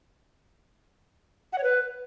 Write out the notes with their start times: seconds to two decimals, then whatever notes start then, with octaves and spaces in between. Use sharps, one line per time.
1.53 F#5
1.58 C#5
1.63 B4